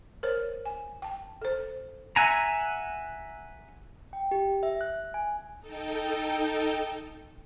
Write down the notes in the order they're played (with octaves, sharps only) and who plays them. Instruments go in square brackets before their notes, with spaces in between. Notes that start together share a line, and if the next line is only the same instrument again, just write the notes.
[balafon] A#4 C5 C#5
G#5
G5 A5
A4 C5
[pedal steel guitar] E5 F#5 G#5 A#5
[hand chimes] G5
G4
E5
F#6
G#5
[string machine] D#4 A4 G5